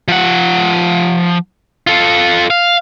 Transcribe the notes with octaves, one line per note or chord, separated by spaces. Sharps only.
F3 F#5
F4 A4
F5